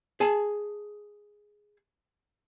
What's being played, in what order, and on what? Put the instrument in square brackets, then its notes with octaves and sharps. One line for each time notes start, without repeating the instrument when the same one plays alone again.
[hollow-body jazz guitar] G#4 G#5 A5